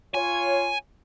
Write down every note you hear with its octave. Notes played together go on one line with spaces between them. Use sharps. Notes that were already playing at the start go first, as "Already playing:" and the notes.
F4 C#5 G#5